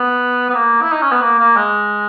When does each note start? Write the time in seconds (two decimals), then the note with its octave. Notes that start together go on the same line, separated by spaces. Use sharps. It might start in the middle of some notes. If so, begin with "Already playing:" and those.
Already playing: B3
0.50 B3
0.54 A#3
0.82 E4
0.92 D#4
1.02 C#4
1.12 B3
1.22 A#3
1.39 A#3
1.56 G#3